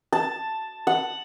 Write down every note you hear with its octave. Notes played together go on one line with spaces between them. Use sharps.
A5
F#5